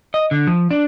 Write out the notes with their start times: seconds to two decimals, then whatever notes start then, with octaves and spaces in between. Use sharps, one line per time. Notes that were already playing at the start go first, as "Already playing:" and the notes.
0.14 D#5
0.31 D3
0.47 F3
0.71 D4